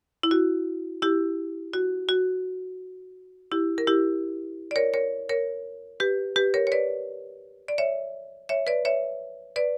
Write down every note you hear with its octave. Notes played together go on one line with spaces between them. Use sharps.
E4
F#4
E4 G4
F#4
F#4
E4 G4
A#4
E4 G4
D5
A#4 C#5
A#4 C#5
A#4 C#5
G4 B4
G4 B4
A#4 C#5
C#5
B4 D5
D5
C#5 E5
C#5 E5
B4 D5
C#5 E5
B4 D5